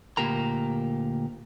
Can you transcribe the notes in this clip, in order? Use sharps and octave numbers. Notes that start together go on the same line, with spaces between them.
D2 A#2 G4 A#4 A#5